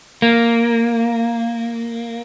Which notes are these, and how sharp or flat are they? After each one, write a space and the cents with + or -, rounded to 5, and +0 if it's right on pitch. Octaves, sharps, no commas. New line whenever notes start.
A#3 -5